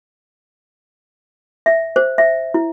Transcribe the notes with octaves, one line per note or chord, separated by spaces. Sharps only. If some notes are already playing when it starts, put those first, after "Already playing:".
E5
C5
E5
E4